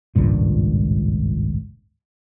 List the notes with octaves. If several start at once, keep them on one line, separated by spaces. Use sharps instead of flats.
G#1 C#2 G2 A#2